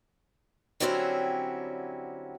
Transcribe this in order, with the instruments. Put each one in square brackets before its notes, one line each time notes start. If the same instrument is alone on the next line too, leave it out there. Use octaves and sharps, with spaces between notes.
[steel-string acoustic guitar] D3 F#3 G3 C4 C#4 E4